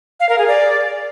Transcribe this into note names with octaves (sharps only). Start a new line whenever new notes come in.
F5
A#4
G#4
D5